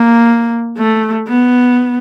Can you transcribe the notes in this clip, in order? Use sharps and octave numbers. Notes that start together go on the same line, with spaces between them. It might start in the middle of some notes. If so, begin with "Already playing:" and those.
Already playing: A#3
A3
B3